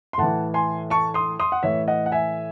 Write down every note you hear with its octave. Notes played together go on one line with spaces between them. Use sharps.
C6
A2 E3 F#5 A5
G#5 C6
A5 C#6
C6 D#6
C6 D#6
F#5
A2 E3 C#5 E5
D#5 F#5
F#5
E5 G#5